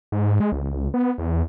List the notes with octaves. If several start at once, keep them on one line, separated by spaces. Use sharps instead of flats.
G#2
G#2
G#3
C#2
B3
E2